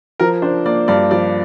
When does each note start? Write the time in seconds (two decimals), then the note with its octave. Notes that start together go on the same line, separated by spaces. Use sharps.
0.20 F3 A#4
0.42 D4 C5
0.66 A#3 D5
0.88 G2 D5
1.11 F3 D5